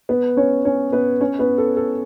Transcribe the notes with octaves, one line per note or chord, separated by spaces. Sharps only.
B3 B4
C#4 C#5
C#4 C#5
B3 B4
C#4 C#5
B3 B4
A4
A4